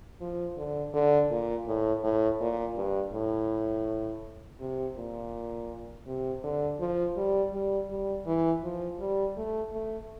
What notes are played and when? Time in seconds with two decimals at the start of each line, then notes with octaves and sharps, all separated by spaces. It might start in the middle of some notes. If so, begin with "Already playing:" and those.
0.21 F3
0.57 D3
0.94 D3
1.30 A#2
1.67 A2
2.03 A2
2.41 A#2
2.76 G2
3.13 A2
4.60 C3
4.97 A#2
6.07 C3
6.43 D3
6.80 F3
7.16 G3
7.53 G3
7.90 G3
8.27 E3
8.63 F3
8.99 G3
9.36 A3
9.73 A3